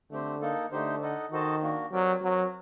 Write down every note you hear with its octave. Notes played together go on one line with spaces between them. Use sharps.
D3 A3 C4 G4 C5
A#3 D#4 A4
D3 A3 D#4 G4 C5
D#4 A4 D#5 F#5
D#3 F#4 A4 C5 D#5 A5
A#3 D4 F#4
F#3 C4 G4 A#4 D5 G5
F#3 C4 F#4 A#4